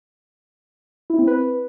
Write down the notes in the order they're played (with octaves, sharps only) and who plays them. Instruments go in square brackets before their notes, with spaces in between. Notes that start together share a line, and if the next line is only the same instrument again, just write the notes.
[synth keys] E4
C4
B4